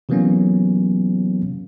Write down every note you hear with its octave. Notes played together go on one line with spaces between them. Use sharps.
C3 E3 F#3 A#3 B3 C#4